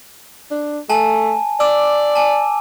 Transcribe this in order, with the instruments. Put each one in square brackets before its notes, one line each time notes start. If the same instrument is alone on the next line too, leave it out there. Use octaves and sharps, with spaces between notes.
[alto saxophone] D4
[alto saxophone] A3 [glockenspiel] G#5 A5
[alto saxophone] D5 [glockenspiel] D6 E6
[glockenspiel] G#5 A5